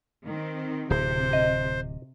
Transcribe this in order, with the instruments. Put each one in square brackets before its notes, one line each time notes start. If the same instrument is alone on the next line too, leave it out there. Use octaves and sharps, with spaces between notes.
[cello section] D#3 C4
[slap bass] D1 [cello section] C3 [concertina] C5
[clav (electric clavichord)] D#5